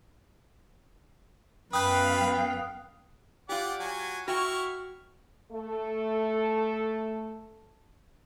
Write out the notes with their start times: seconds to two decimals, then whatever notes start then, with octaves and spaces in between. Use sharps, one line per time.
1.73 F#2 B3 B4 F5 G5 D#6 F#6
3.49 F4 G4 D5 F#5
3.80 F#3 G#5
4.28 E4 F#4 G5 C#6 F6
5.52 A3 A4